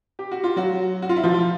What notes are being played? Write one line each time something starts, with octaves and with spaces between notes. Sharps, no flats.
G4
F#4
F4
F#3 F#4
F#4
F4
E4
F3 F4
F4